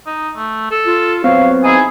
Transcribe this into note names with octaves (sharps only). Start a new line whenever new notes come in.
D#4
A3
A4
F4
F#3 B3 C4 C#5 F5
D#4 E4 G#4 G#5